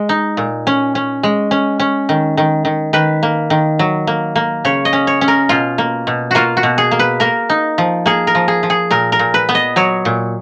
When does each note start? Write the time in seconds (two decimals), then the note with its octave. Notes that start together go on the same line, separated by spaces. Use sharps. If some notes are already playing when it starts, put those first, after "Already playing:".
Already playing: G#3
0.09 D#4
0.37 A#2
0.67 C#4
0.95 C#4
1.23 G#3
1.51 C#4
1.80 C#4
2.09 D#3
2.37 D#3
2.65 D#3
2.93 D#3 B4
3.23 A#3
3.50 D#3
3.79 F#3
4.07 A#3
4.36 A#3
4.65 C#3 C#5
4.85 D#5
4.93 C#4
5.07 C#5
5.21 C#4
5.28 A#4
5.49 B2 F4
5.78 A#3
6.07 B2
6.31 A#3 F4 F#4
6.57 F#4
6.63 B2
6.78 G#4
6.91 A#3
6.99 B4
7.20 A#3 A#4
7.50 D#4
7.78 F3
8.06 A#3 G#4
8.27 A#4
8.35 F3
8.48 G#4
8.63 F3
8.70 G#4
8.91 A#2 A#4
9.12 A#4
9.19 A#2
9.34 B4
9.49 B3
9.55 D#5
9.76 F#3 C#5
10.05 A#2